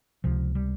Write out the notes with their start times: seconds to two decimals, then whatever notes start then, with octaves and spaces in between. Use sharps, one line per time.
0.24 C#2 C3 F3
0.55 G3